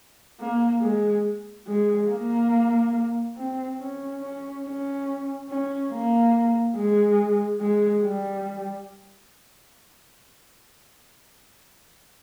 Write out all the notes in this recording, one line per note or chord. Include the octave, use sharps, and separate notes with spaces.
A#3
G#3
G#3
A#3
C4
C#4
C#4
C#4
C#4
A#3
G#3
G#3
G3